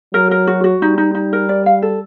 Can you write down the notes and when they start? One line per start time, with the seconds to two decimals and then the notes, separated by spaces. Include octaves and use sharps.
0.14 F#3 A#4
0.31 A#4
0.47 F#4
0.64 F#4
0.82 G3 D#4
0.98 D#4
1.15 D#4
1.33 A#4
1.49 D5
1.66 F5
1.82 A4